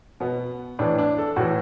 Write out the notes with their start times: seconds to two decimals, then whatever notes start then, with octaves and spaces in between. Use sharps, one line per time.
0.20 B2 B3
0.79 A2 E3 D4
0.98 D4
1.18 A4
1.36 A2 E3 F#4